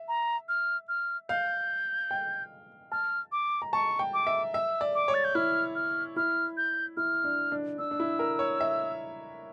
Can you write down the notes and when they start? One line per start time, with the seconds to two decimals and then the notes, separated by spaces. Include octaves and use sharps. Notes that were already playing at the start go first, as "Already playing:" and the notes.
Already playing: E5
0.08 A#5
0.49 F6
0.89 F6
1.29 F5 G6
2.11 G5
2.92 A5 F6
3.32 D6
3.62 A#5
3.73 A5 C#6
3.99 G5
4.14 D6
4.27 E5
4.54 E5 E6
4.81 D5
4.95 D6
5.08 C#5
5.14 A6
5.24 G6
5.35 E4 F6
5.75 F6
6.16 E4 F6
6.57 G6
6.97 E4 F6
7.24 D4
7.52 D4
7.79 D4 E6
7.91 D4
8.00 E4
8.19 A#4
8.39 C#5
8.60 E5